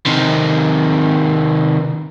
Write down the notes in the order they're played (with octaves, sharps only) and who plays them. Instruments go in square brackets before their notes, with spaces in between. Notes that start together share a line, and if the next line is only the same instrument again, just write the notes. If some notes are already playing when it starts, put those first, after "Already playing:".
[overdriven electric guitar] C3 D#3